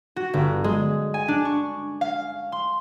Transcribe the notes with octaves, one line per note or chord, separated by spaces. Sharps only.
F#4
G1
G#3
G#5
D4
C#6
F5
C6